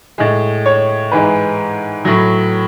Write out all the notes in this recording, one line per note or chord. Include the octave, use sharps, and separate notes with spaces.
A2 G#3
C#5
G#2 E3 G#3 B4
A2 F#3